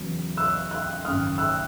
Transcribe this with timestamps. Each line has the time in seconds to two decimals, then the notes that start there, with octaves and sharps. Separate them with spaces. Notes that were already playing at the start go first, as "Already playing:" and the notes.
Already playing: E2 C#3 F#3
0.37 E6 F#6
0.71 E6 F#6
1.04 G#1 F#2 C#3 D#6 F6
1.38 E6 F#6